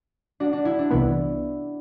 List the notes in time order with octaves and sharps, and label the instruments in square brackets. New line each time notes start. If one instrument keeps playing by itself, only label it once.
[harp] D4 F#4
D4
E4
D4
[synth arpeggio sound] C2 C3 E3 B3 [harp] E4